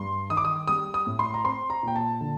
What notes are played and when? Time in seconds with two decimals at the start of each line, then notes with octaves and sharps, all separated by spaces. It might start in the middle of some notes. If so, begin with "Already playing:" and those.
Already playing: G2 C6
0.30 D#3 D#6
0.37 D6
0.45 D#6
0.67 G3 D#6
0.94 D#6
1.07 A2
1.19 C6
1.34 A#5
1.44 C4 C6
1.70 A#5
1.83 A#2 G5
1.96 A5
2.21 D3